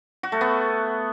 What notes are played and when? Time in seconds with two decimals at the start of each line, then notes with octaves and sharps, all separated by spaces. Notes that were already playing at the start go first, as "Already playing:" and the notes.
0.23 F#4
0.32 A3
0.41 B3